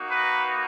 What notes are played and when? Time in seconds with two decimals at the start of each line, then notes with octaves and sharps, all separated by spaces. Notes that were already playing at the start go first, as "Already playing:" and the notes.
Already playing: A#3 D#4 F#4
0.11 B4